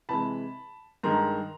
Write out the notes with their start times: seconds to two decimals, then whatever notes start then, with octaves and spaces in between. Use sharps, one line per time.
0.09 C3 E3 G#3 A5 B5
1.03 G2 D#3 G#3 A#5 C6